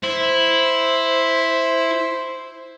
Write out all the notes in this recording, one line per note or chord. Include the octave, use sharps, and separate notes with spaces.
E4 C5